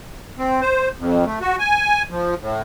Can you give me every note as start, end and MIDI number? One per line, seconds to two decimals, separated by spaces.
0.38 0.61 60
0.62 0.89 72
0.99 1.25 41
1.25 1.39 57
1.41 1.56 66
1.59 2.03 80
2.11 2.35 53
2.41 2.62 45